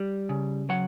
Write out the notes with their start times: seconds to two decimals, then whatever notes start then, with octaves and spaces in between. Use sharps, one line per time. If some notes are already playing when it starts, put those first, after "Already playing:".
Already playing: G3
0.29 C#3
0.69 F#3 F#5